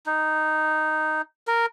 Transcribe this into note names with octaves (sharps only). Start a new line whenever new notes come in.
D#4
A#4